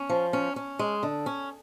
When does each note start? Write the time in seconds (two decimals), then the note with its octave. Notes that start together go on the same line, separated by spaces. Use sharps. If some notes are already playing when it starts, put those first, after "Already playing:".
Already playing: C#4
0.09 F3
0.33 C#4
0.56 C#4
0.79 G#3
1.03 D3
1.26 C#4